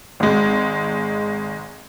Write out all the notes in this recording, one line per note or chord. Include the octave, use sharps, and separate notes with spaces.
G#1 G#3